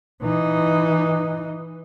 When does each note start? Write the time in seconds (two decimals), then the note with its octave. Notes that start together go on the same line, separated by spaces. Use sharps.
0.22 E3 D#4